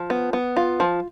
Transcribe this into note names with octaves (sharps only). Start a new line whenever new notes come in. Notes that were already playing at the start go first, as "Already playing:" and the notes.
Already playing: F3
B3
B3
F4
F3